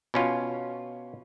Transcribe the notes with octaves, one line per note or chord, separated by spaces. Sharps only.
B2 C#4 F4